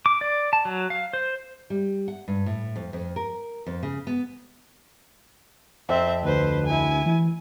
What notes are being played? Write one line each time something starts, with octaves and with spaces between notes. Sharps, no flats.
D6
D5
A5
F#3
F5
C5
G3
F#5
G2
A2
F2
F2
A#4
F2
C#3
B3
F2 C4 E5
D2 B4 C5
E4 G#5
E3